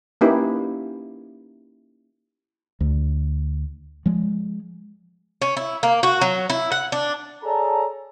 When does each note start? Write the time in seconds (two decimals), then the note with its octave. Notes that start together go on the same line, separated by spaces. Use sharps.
0.21 A#3 C#4 D#4 E4 G4 B4
2.80 D2
4.06 F3 G#3
5.42 C#4
5.57 E4
5.83 A#3
6.03 F#4
6.21 F#3
6.50 E4
6.72 F#5
6.92 D4
7.43 G#4 A4 C#5 D5 A5 A#5